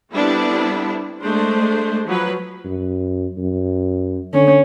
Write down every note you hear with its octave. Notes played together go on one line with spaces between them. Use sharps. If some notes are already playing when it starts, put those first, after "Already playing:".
G3 B3 C4 D4 E4 A4
G#3 A3 D4 C5
F3 F#3 B4
F#2
F#2
D3 C#4